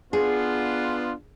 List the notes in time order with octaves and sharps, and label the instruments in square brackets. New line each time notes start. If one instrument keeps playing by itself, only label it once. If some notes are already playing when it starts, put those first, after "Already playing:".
[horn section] B3 D4 F4 [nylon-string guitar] G#4